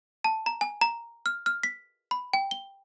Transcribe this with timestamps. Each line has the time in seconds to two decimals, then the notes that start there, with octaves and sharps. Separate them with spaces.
0.24 A5
0.46 A#5
0.61 G#5
0.81 A#5
1.26 F6
1.46 F6
1.63 B6
2.11 B5
2.33 G5
2.51 G7